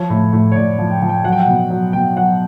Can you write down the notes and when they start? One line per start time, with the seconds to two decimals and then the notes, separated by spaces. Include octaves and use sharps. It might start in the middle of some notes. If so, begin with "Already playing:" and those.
Already playing: F3 C#5
0.10 A2
0.33 A2
0.52 C#5
0.56 A2 D5
0.79 F3
0.90 G5
1.02 F3
1.09 G5
1.24 F#3 F#5
1.32 G5
1.40 F#5
1.47 B2
1.70 F#3
1.93 B2 G5
2.16 F#3 F#5